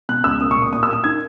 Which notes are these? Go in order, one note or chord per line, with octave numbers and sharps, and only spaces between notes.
B2 F#6
C#2 E6
A#3 D#6
C#6
A#2
D#6
A#2 D#6
E6
A#3
D#6
D#4 G#6